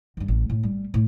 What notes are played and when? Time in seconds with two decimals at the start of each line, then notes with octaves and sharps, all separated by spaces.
0.17 G2 D#3
0.28 A1
0.50 A2
0.63 G3
0.94 A2